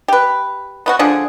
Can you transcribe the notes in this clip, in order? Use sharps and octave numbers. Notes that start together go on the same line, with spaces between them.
G4 B4
B3 F4 F#4
D3 F3 D4 G#4